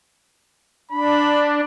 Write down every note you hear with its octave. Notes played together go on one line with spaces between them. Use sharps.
D4 B5